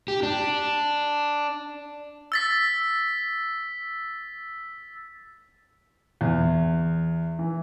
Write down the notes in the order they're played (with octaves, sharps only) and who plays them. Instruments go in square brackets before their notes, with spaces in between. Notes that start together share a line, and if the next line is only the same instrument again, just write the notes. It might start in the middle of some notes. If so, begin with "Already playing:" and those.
[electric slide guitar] G4
D4
[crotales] E6 A6 B6
[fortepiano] E2
E3